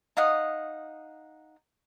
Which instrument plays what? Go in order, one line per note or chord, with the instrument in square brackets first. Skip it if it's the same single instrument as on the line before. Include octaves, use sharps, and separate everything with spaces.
[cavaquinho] D#4 F5 F#5 D#6